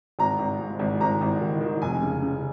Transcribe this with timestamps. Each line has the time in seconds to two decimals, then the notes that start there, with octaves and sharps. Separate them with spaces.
0.19 G#1 A#5
0.39 G#1
0.59 G#2
0.79 G#1
1.00 G#1 A#5
1.21 G#1
1.41 D#3
1.61 D#3
1.82 F1 G#5
2.02 C#3
2.22 C#3